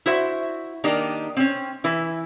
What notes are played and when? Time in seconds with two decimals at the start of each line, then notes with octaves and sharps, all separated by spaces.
0.06 E4 F#4 C5 E5
0.84 D#3 A#3 D4 D#4 G4 A#4
1.37 C4 C#4
1.84 E3 E4 B4